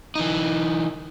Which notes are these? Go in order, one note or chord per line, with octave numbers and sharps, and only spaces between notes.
E3 D#4